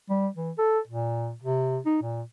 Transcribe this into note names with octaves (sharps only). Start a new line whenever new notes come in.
G3
E3
A4
A#2
C3
D#4
A#2